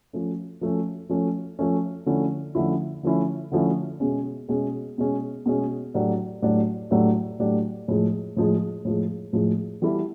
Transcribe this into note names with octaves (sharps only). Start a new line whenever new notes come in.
F3 A3 C#4
F3 A3 C#4
F3 A3 C#4
F3 A3 C#4
D3 F3 A3 C#4 E4
D3 F3 A3 C#4 E4
D3 F3 A3 C#4 E4
D3 F3 A3 C#4 E4
B2 G#3 C#4
B2 G#3 C#4
B2 G#3 C#4
B2 G#3 C#4
A2 F#3 A3 D4 G4
A2 F#3 A3 D4 G4
A2 F#3 A3 D4 G4
A2 F#3 A3 D4 G4
A2 F3 G#3
A2 F3 G#3
A2 F3 G#3
A2 F3 G#3
E3 G3 B3 E4 A4